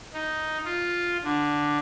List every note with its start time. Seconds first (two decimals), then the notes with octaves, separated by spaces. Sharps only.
0.13 D#4
0.65 F4
1.24 D3